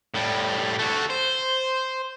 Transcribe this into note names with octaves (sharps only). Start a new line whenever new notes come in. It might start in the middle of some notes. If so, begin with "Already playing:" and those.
A2 G3
A3 F#4
C5